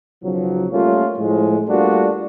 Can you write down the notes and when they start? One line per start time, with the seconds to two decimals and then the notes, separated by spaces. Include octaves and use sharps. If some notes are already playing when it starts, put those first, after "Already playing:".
0.23 B1 C#3 F3 F#3
0.71 G3 A3 A#3 C#4 F4
1.17 A2 F3 G#3
1.68 G3 A3 A#3 D4 F4 F#4